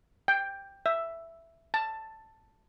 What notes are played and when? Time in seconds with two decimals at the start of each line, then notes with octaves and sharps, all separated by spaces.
0.28 G5
0.86 E5
1.74 A5